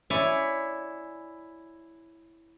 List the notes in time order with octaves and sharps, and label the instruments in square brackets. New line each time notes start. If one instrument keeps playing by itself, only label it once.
[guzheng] E4 C#5 D5 G#5